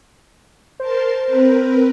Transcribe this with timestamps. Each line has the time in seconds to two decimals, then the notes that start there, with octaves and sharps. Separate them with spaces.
0.80 A#4 C5 A5 C6
1.27 C4 A#4 B4